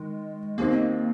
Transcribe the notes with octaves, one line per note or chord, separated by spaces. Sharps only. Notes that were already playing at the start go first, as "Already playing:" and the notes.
Already playing: D#3 G#3
D#2 D#3 A#3 C4 D#4